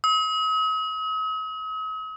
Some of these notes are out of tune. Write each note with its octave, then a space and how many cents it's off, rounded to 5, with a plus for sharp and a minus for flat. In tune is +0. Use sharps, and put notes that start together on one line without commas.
D#6 +45